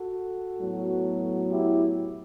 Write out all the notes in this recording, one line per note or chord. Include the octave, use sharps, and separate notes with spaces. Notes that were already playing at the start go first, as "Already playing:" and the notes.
Already playing: F#4 A4
A2 F#3 B3
E4 G4